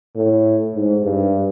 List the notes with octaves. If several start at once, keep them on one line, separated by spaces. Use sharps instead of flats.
A2
G#2
G2